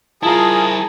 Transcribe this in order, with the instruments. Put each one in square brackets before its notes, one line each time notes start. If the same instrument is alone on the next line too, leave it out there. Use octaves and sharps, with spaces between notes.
[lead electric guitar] E4 A#4 [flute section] F4 D#6 [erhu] G#4 [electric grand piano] A5 A#5